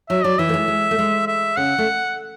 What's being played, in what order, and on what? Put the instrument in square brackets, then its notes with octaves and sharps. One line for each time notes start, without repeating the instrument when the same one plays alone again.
[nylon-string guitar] F#3 [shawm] E5
[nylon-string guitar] F#3 [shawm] D5
[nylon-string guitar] E3 [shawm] E5
[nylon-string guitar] A3
G#3
G#3
A3
G#3
[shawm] E5
[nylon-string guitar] C#3 [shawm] F#5
[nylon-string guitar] A3